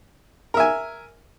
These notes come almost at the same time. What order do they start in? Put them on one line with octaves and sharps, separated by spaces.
A#4 E5 G#5